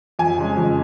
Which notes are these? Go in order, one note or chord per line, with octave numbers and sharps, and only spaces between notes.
F2 G#5
C#3 G#3
F2